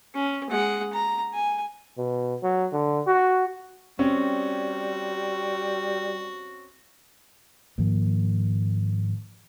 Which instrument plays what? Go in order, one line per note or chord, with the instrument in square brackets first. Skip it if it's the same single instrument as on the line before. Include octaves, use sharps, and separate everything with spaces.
[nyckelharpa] C#4
G#3 F#5
A#5
G#5
[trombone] B2
F#3
D3
F#4
[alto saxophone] G3 [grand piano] C4 C#4 [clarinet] F#4
[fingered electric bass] G#2 D#3 F3 A#3